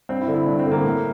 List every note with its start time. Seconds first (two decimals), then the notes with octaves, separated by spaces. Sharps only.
0.09 G2 C4
0.21 E4
0.28 D3
0.34 E4
0.46 G2 D4
0.59 C4
0.66 D3
0.72 A#3
0.84 A2